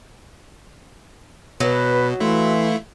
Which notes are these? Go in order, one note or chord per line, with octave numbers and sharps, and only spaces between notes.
B2 F#3 B4
E3 A3 E4 F5 C6